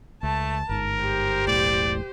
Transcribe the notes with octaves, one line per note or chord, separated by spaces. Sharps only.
C#2 A3 A5
G1 G#2 A#4
G4 C5
E1 B1 A2 D5